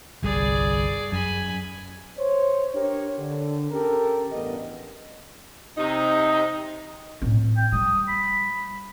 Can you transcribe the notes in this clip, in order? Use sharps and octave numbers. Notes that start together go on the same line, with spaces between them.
G1 C2 G3 G#4 D5
F#2 G#5 B5
C5 C#5
D4 G4 A#4 C#5
D3
C#4 G4 A4 A#4
A1 E2 G2 B3 D#5
C3 D#4
A2 C4
G5
G3 D#6
B5